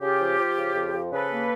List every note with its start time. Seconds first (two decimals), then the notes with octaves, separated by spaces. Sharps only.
0.02 C#3 F4 G4
0.21 F3
0.39 F3
0.57 C#3
0.75 F2
0.93 F3
1.12 C#3 A4 B4
1.31 A#3